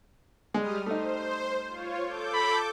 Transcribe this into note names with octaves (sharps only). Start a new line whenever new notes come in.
G3 G#3 D#6 F6
A3 D#4 C5
F4 C#5
A4 D6 G6
B5